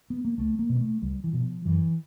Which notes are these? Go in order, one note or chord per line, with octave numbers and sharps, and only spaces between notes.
B3
A#3
C#2 A3
A#3
B2
A#3
A3
C#2 G3
E3
B2 F3
F#2 E3